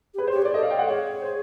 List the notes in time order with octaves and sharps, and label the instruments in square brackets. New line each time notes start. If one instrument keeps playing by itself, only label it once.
[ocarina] G4
[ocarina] G#4 [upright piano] B4
[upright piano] C5
[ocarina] G4
[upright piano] C#5
[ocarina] G#4
[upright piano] D5
[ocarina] A4 [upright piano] D#5
[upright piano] F5
G5
F#5
[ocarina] G#4 [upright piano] C#5
[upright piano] C5